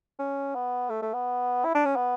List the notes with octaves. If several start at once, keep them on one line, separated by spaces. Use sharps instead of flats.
C#4
B3
A3
A3
B3
E4
D4
C#4
B3